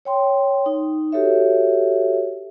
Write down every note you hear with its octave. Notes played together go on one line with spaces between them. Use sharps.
C#5 G5 C6
D#4
F#4 G4 A4 C#5 E5